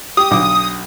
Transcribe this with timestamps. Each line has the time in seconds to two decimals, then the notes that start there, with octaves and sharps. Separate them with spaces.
0.17 G4 D#6
0.31 B1 D3 D6